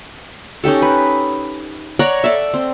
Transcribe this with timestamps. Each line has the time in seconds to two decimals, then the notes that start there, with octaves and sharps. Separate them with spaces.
0.64 C#4 D#4 G4 A4
0.82 B4
1.99 C#5 D5 F#5 A#5
2.24 A4 D5 E5
2.54 C4